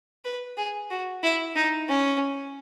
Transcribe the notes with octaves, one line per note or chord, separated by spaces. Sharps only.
B4
G#4
F#4
E4
D#4
C#4